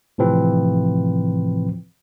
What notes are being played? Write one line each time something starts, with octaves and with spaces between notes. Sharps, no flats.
A2 C3 E3 F3 C4 B4